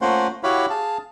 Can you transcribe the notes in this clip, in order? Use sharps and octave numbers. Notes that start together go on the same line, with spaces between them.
A3 A#3 C#4 F4 C5 F#5
E4 F#4 G4 C#5 F5 B5
G#4 F5 A5